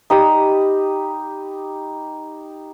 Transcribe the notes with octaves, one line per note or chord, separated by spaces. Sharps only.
D#4 G4 B5 D#6